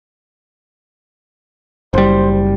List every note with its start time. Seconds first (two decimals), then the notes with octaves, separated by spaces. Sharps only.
1.94 F#1 G3 C5